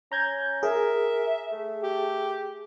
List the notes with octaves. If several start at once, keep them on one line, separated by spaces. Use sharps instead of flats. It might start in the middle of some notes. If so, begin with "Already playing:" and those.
C#4 A#5 G6 G#6
G#4 A#4 E5
A3
G4